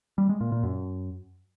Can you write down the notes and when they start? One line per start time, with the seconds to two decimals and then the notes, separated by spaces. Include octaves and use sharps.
0.18 G3
0.29 G#3
0.41 A#2
0.52 A#2
0.63 F#2